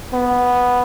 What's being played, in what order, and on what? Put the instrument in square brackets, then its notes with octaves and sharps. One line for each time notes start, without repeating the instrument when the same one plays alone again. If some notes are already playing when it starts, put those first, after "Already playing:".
[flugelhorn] B3